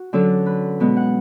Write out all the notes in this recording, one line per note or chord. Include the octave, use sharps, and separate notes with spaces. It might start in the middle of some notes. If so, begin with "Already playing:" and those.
Already playing: F#4
D3 F#3 C#4 A4
B4
B2 G#3 B3
F#5